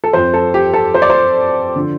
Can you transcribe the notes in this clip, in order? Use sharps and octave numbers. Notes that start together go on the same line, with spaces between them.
A4
F2 F3 C5
A4
G4
A4
C5
D5
C5
D3 F3